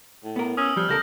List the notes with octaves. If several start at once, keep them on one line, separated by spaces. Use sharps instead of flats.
A2
B3 A#4
C#4 D#6 E6
F3 G3 E6 F6
C#2 A4 A#4 G6 A#6